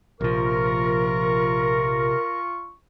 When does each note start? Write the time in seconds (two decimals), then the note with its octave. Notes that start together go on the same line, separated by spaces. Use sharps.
0.21 A#1 C3 F3 F4 A#4 C#6